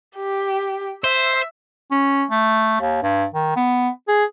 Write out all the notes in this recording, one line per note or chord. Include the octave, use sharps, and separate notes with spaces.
G4
C5 E5
C#4
A3
D#2
G2
D#3
B3
G#4